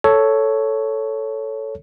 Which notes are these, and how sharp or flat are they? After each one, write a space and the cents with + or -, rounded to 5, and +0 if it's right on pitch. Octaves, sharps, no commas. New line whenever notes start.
A4 +0 C#5 +5